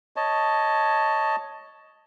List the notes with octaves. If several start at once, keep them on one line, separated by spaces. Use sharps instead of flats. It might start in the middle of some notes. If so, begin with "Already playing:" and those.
C#5 D#5 A5